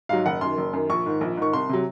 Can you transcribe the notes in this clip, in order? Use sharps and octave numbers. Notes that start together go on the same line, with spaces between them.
G#2 F#3 F5
F#1 F#5
F#2 D#3 C6
F#1
F#2 D#3
A#1 C#6
G#2 D#3
A#1
G#2 D#3 C#6
C2 C6
C3 F#3